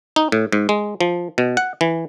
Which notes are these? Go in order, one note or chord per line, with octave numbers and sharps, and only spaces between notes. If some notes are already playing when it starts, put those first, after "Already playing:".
D#4
A2
G#2
G#3
F3
B2
F#5
E3